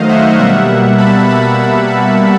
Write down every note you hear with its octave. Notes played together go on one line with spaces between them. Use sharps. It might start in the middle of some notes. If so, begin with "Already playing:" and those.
Already playing: D#3 F#3 A3 C5 D#5 F5
E5 F#5
B2 G3 A#3 E5 F#5
A5 B5
A5 B5